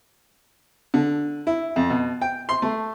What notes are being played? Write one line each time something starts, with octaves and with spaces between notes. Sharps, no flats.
D3
E4
F2
B2
G5
C6
A3